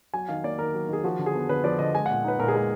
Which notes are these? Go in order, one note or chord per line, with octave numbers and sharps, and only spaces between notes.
F#3 G#5
D#3 F5
A#3 D5
D#3 A#4
F#3
D#3 G#4
F3 F#4
D3
G#4
B3
D3 B4
F3 D5
D3 D#5
G#3 G#5
A#2 F#5
D#4 B4
A#2 A#4
G#4
G#3 A#4